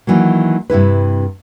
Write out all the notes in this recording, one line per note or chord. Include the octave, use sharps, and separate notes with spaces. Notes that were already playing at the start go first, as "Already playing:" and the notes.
D#3 E3 F#3 A#3
G2 C3 E4 B4